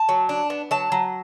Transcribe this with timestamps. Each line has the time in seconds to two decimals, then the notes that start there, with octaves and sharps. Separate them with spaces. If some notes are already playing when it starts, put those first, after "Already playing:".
Already playing: A5
0.09 F#3
0.29 D4
0.50 B3
0.71 F#3 A5
0.92 F#3